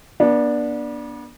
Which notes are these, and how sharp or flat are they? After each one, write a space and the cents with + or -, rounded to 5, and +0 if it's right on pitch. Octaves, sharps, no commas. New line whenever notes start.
B3 -40 D4 +0